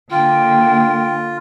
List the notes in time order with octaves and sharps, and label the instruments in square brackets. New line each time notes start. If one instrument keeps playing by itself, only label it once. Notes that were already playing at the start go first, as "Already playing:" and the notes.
[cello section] D3 A#3 [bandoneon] F4 [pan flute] G5